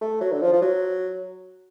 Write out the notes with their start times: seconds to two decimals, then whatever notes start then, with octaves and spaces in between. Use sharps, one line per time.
0.01 A3
0.21 F#3
0.32 D3
0.42 F3
0.53 F3
0.62 F#3